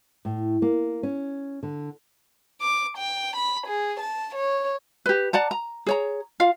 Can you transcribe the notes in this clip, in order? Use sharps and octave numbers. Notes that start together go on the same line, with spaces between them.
A2
A#3
C#4
D3
D6
G5
B5
G#4
A5
C#5
G4 B4
D5 F#5 A5 A#5
A#5
G#4 C#5 A#5
F4 F5